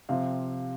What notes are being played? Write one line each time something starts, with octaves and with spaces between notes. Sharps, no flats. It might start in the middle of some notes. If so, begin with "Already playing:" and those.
C3 F3 C4 F5